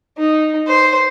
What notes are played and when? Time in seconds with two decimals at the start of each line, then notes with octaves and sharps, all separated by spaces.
0.18 D#4
0.68 C5